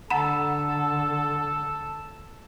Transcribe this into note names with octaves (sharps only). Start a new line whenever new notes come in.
D3 A4 F#5 A#5 B5